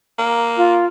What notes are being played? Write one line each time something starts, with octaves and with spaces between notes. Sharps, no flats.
A#3
F4